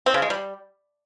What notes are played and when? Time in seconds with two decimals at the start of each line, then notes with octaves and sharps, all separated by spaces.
0.06 C4
0.14 C#3
0.22 G#3
0.30 G3